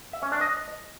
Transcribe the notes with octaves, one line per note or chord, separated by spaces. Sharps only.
E5
C#4
D4
D#5